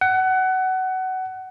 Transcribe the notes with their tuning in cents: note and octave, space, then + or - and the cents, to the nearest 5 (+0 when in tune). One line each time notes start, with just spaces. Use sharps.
F#5 +20